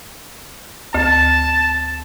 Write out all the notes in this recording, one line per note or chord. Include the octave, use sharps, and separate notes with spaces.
D2 A5